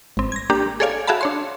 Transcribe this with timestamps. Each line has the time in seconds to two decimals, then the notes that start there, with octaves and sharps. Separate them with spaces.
0.17 G#1 C4
0.32 G#6 A#6
0.50 A#3 D4 G4
0.80 G#4 A4 C#5 D5 F5 G#5
1.07 F#4 G#4 E5 F5 A5 B5
1.21 D4 C#5 C6